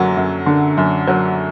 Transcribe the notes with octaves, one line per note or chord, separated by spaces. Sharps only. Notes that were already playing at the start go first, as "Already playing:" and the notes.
Already playing: F#2 D3 F#3
F#2
D3
F#2
F#3